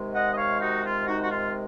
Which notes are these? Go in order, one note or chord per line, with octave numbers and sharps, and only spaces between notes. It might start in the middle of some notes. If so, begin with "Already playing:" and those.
Already playing: C3 D#3 G#3
D#5 F#5
D#5
C#5 F5
D#4 F#4
F4
D#4 F#4
F#4
F4